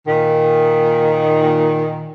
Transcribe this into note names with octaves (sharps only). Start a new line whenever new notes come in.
A#2 D#3